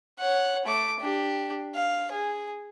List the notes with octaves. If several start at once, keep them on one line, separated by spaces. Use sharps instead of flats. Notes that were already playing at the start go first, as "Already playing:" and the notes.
C#5 F#5
A3 D6
D4 G4
F5
G#4